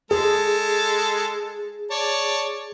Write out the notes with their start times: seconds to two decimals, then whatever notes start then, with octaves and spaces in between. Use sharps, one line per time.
0.11 G#3 G#4 A4
1.91 C#5 D5 A5